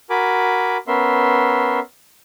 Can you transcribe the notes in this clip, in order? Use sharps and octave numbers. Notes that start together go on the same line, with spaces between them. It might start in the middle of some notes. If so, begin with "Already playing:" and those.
F#4 A#4 G#5 B5 D6
B3 C#4 A#4 E5 C6